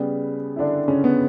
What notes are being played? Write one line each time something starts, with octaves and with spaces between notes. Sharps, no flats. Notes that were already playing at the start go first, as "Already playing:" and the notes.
Already playing: C#3 G3 B3
E4
D3 D4
C#3 C#4
B3